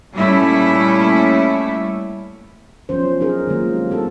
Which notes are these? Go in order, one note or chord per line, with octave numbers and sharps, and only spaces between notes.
A#2 G3 A3 C#4 E4
F3 F#3 B3 C#4 C5
D#4 G#4 A#4
D#3 F3 F#3 G#3 A#3 F4
C4 G4
A3 B3 F#4 A4